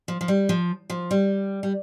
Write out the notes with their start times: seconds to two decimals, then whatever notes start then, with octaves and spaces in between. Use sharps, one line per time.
0.08 F3
0.21 F3
0.28 G3
0.49 F3
0.90 F3
1.11 G3
1.63 G3